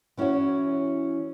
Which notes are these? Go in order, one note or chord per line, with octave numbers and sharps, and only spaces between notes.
E3 C#4 E4 F#4 C#5